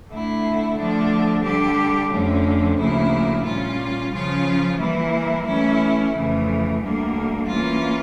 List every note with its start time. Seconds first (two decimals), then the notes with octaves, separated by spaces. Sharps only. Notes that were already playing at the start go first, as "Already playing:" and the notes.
0.10 D3 A3 E4
0.77 D3 F3 A3 D4
1.44 D3 G3 D4 G4
2.11 F2 D3 F3 A3 C#4
2.78 D2 C#3 F3 A#3 E4
3.46 A#2 G3 C#4 F4
4.12 C#3 F3 C#4 F4
4.79 E3 G3 A#3 E4
5.47 E3 A3 C#4 E4
6.14 F2 C#3 E3 A3
6.81 D2 D3 G3 A#3
7.48 E3 A#3 C#4 F4